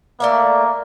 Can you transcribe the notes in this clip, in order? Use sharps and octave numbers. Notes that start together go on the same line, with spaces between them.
A3 A#3 D5 E5